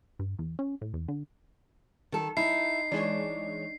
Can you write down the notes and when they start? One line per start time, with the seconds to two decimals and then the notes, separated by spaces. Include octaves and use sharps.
0.19 G2
0.39 E2
0.59 C#4
0.81 A2
0.94 E2
1.08 D3
2.12 D#3 A4
2.37 D#4 E4 C7
2.92 E3 G#3 D4 C#5